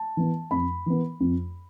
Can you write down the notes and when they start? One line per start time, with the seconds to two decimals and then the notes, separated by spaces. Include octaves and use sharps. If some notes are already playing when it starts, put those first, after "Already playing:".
Already playing: A5
0.17 E3 B3
0.51 F2 B5
0.86 E3 B3
1.20 F2